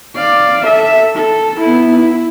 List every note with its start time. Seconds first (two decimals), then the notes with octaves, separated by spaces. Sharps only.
0.16 D5 F5
0.65 A4 E5
1.16 A4
1.61 B3 E4
1.99 E4